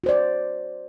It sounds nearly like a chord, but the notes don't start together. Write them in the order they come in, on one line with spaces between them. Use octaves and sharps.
F#4 C5 D5